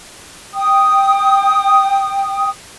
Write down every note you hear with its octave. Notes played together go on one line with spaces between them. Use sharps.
G5 D#6